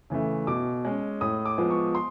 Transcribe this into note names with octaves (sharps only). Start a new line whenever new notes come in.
C#3 E3 A3
B2 D6
G#3 C#4
A2 D#6
D6
F3 G#3 B3
C#6
C6